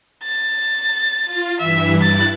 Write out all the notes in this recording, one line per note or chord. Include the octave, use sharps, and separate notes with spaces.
A6
F4
G2 E3 E5
G2 E4 F#6 A6